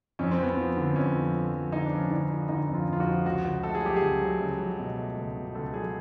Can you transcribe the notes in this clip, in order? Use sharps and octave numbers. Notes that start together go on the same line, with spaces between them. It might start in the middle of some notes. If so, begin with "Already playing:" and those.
F2 C#4
C4
F2 B3
F3 C4
D3
C4
F2 C#4
F3
F3
F3
D3 D#4
D4
F3
C#4
D3 D4
F3
D3 D#4
F2
F4
F2
F4
F#4
F3
C#2 F#4
C#2
A3 A4
G#4
F#3 G4
G#4
C#2
F#3
C#2
F#3
B2
A3
C#2
B2
C#2 A4
F#3 G#4